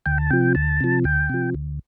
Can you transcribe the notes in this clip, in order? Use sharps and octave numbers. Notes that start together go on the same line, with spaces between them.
D2 G5
A5
C3 F3 G5
D2 A5
C3 F3
D2 G5
C3 F3
D2